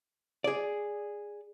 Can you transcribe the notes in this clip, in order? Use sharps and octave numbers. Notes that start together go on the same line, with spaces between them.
G#4 D5